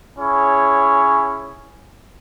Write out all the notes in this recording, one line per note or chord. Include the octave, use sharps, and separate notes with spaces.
C#4 E4 G#4 C#5